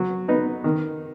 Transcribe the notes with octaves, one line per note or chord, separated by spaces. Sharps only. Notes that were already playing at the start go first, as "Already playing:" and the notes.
Already playing: F#3
B3 D#4
D#3